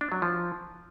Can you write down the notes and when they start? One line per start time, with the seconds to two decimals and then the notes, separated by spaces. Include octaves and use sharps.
0.01 D4
0.12 F#3
0.22 F3